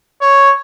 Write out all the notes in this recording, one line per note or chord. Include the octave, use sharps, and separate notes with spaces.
C#5